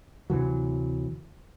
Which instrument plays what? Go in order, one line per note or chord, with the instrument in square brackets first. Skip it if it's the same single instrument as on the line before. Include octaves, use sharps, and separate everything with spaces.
[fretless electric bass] D2 C3 E3 F#3